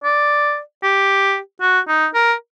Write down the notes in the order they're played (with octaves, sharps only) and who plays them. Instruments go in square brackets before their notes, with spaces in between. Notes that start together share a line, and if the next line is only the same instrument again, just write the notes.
[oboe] D5
G4
F#4
D#4
A#4